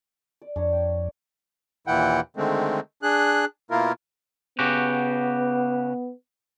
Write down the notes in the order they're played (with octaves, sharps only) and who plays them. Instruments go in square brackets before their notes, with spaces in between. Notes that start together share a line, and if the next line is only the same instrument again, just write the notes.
[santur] D5
[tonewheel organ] F2 [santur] D4 C#5 A#5
[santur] G5
[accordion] D#2 A#2 E3 E4 F#5 G5
D3 D#3 G#3 A3 C4
D4 G#4 F#6
B2 A#3 E4 F4 A#4
[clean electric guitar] C#3 F#4 G4 [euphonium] B3